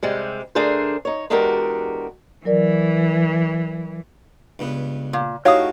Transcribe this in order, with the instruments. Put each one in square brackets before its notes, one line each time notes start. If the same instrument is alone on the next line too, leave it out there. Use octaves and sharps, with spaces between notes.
[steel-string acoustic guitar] C3 G3 G#3
D3 A3 D4 G#4 A#4 C5
D#4 C#5
E2 G#3 D4 F#4 G4 A#4
[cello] E3 [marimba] F#3 A#4 D5
[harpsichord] C#2 G2 B3
[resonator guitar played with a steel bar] A#2
[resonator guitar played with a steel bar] A2 F#4 F5 [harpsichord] D#4 G4 [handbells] C#5 D#6